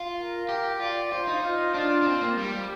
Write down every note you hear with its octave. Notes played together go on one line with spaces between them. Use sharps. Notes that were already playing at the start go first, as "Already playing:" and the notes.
Already playing: F4
A#4
G4
F4 D5
F4 C5
D#4
F4
D4 F4
D4
C4
A#3
G3 G4